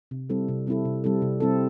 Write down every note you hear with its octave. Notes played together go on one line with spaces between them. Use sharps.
C3
G3 C4 E4 A4
C3
G3 C4 E4 A4
C3
G3 C4 E4 A4
C3
G3 C4 E4 A4